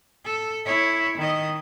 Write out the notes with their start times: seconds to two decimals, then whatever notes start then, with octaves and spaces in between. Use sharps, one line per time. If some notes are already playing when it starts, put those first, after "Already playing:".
0.25 A4
0.65 E4 C#5
1.17 D#3 D#5